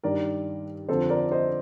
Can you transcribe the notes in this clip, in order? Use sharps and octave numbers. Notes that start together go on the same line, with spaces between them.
G2 D#3 A#4 D5
F2 D3 F3 A4 C5
A#4 D5
C5 D#5